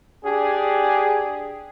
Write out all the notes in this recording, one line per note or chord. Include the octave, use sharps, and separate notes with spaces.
D4 G4 G#4